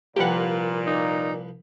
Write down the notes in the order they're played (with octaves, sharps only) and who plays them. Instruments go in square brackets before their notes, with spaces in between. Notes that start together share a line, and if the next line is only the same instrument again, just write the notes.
[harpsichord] C2 F3 B4 [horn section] A#2 [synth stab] G4 F#5
[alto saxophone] D#4